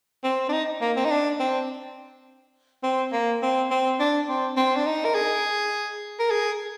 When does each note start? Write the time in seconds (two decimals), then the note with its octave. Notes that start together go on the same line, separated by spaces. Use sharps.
0.24 C4
0.49 D4
0.52 D#4
0.81 A#3
0.96 C4
1.05 D#4
1.10 D4
1.40 C4
2.83 C4
3.12 A#3
3.42 C4
3.71 C4
4.00 D4
4.29 C4
4.57 C4
4.76 D4
4.86 D#4
5.05 A#4
5.15 G#4
6.19 A#4
6.31 G#4